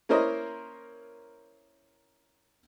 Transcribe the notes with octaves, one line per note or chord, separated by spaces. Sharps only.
A#3 C#4 E4 A#4 C5 D#5